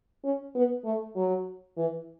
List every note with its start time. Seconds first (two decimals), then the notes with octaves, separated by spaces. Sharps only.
0.24 C#4
0.55 B3
0.85 A3
1.16 F#3
1.77 E3